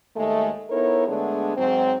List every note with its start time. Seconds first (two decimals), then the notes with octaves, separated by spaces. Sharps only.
0.16 D#2 G#3 A3
0.70 B3 D#4 E4 A4 A#4 C#5
1.08 D3 G#3 A3 B3 D4 G#4
1.57 G#2 F#3 C4